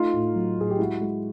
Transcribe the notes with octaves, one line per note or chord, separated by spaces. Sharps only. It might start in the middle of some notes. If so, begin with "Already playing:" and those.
Already playing: A3 D#4 F4
A2
F#3
A2 G#4
G4
G#3 E4 F#4
G#3